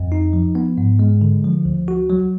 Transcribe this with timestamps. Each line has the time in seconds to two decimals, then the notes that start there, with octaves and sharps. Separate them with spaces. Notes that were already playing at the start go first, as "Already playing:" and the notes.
Already playing: F2
0.12 D#4
0.33 F3
0.55 B3
0.78 G#2
0.99 G#3
1.21 D3
1.44 F3
1.65 D2
1.88 F#4
2.10 F#3